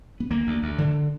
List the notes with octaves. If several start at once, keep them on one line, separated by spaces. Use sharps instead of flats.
B3
D2 A#3
D2
D2
D3